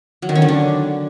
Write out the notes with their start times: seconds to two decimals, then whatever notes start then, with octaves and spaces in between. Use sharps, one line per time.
0.22 F#3
0.29 D#3
0.35 C#4
0.42 D3
0.48 D4